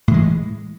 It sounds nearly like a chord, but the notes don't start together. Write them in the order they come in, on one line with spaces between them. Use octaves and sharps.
A2 E3 G#3